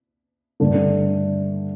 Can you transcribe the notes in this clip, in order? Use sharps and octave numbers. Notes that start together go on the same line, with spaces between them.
G2 D3 A3 D4